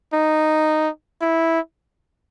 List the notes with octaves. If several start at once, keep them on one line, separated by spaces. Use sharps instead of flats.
D#4
E4